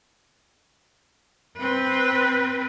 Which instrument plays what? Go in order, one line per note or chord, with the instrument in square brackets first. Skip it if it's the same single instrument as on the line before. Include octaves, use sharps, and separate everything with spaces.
[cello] C4 B4